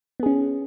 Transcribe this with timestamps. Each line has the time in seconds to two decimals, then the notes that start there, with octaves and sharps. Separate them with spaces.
0.20 B3
0.23 G#4
0.26 C#4